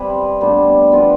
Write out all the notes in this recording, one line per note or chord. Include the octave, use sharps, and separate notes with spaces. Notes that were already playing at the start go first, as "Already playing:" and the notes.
Already playing: G3 C4 E4 B4
A2 G3 B3 D4
F3 B3 F4 B4